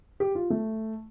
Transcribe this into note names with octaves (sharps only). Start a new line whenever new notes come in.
G4
F4
A3